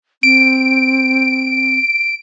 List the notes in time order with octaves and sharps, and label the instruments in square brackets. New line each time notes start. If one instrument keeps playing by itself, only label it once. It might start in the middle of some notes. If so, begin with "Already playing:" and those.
[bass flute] C4 [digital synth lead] D7